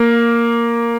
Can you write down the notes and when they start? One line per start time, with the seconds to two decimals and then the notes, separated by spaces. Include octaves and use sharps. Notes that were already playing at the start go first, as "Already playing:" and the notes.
Already playing: A#3